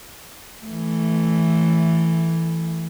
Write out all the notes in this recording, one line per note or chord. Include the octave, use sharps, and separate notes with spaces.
E3 A3